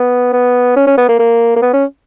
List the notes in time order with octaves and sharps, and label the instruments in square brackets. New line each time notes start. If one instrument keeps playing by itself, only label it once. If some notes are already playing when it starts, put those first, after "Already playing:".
Already playing: [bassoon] B3
B3
C#4
C#4
B3
A#3
A#3
A#3
B3
C#4